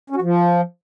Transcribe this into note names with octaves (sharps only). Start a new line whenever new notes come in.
C#4
F#4
F3